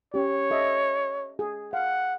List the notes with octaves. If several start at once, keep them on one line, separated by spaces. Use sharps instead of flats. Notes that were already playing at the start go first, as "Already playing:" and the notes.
C#4 G4 C#5
A4 D#5 E5
G#4
F5 F#5